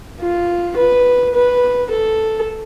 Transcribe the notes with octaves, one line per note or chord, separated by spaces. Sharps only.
F4
B4
B4
A4